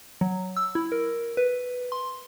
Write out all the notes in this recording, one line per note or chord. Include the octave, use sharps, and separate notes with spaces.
F#3
E6
E4
A#4
B4
C6